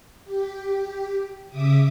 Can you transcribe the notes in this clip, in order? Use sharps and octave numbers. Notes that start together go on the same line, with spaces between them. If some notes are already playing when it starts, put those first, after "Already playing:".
G4
C#3 E5 D6 D#6